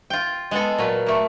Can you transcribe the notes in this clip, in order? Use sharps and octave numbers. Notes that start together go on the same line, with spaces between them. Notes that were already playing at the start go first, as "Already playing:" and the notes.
F4 G5
G#3 B3 A4
A#2 F#3 B4
A3 A#3